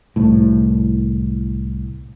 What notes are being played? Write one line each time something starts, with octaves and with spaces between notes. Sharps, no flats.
C2 A2